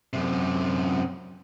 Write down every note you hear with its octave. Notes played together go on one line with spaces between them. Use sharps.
F#2 C3